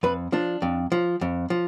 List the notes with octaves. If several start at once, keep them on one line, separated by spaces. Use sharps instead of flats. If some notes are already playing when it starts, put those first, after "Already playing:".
F2 B4
F3 D4
F2
F3
F2
F3